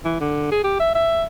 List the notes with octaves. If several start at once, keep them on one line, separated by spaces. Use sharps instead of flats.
E3
D3
G#4
G4
E5
E5